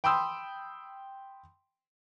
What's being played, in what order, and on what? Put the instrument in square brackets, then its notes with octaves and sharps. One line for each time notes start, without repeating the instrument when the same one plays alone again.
[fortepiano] G5 B5 C6 D#6 E6